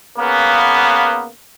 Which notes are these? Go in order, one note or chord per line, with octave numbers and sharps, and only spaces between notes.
C#3 A#3 B3